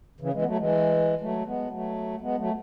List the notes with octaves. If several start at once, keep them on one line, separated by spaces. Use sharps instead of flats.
C#3 E3
E3 G#3
B3
F#3 A3
E3 G#3
F#3 A3
G#3 B3
F#3 A3
G#3 B3
F#3 A3